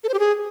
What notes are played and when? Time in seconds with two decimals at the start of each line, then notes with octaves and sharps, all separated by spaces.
0.04 A4
0.09 C5
0.14 G4
0.19 G#4